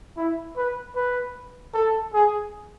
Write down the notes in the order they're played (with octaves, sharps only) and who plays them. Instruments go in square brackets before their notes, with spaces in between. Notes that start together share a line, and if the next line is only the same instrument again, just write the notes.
[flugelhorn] E4
B4
B4
A4
G#4